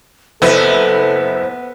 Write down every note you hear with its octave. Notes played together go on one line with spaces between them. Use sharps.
F#1 B3 E4 A4 C5